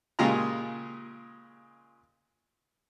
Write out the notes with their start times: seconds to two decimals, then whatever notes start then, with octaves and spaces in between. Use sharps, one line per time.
0.19 A#2 C#3 G#3 F4 G4 A#5